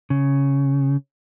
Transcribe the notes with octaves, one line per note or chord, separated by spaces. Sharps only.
C#3